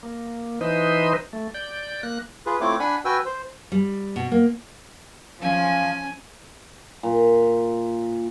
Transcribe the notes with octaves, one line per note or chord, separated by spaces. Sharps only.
A#3
E3 D#4 B4 C5 D#5
A3
D5 G6
A#3 F#6
F4 G#4 B4
A3 C4 E4 F4 C#5 D6
D4 F#5 G#5 B5
F#4 B4 G5 G#5 E6
C5
G3
B2
A#3
F3 C#4 F5 G#5
A#2